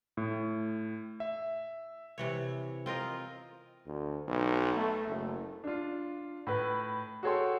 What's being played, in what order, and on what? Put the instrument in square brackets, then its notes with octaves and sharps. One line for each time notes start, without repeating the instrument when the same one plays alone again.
[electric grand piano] A2
E5
[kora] C3 E3 C#5
C4 F4 A#4 D#5
[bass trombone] D2
B1
A3
F#1
[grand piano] D4 F4
A2 B4
F#4 G#4 A4 C#5 G5 C6